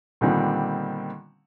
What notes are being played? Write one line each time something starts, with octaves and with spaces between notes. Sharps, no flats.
A#2 D3 D#3 G3 B3 C4